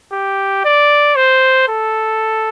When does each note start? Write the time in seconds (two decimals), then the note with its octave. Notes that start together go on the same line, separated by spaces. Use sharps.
0.12 G4
0.65 D5
1.16 C5
1.68 A4